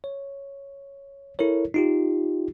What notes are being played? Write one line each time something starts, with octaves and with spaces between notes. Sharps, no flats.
C#5
E4 A4 A#4 C#5
D#4 F4 G4